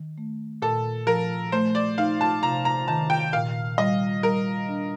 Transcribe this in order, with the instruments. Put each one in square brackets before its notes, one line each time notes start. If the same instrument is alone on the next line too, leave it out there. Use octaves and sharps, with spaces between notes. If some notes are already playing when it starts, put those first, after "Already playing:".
Already playing: [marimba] D#3
A3
[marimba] A#2 [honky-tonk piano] A4
[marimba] F3 [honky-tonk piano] A#4
[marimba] A3 [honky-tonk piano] C5
[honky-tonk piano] D5
[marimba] D#4 [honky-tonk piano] F5
[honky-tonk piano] A5
[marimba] C3 [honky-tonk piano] A#5
[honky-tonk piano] A#5
[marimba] D#3 [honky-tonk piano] A5
[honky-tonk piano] G5
[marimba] A#2 [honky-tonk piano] F5
[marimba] G3 [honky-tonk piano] D#5
[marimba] G3 [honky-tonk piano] A#4
[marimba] D4